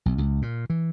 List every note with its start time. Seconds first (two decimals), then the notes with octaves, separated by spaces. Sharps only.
0.06 B1
0.18 C#2
0.42 A#2
0.70 E3